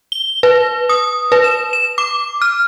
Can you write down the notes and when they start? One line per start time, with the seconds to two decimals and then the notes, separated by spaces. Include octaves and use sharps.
0.12 G7
0.43 B4
0.89 D#6
1.32 B4
1.44 E7
1.73 E7
1.98 D6
2.42 F6